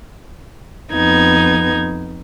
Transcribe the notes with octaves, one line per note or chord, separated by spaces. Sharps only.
F2 B3 D#4 G#6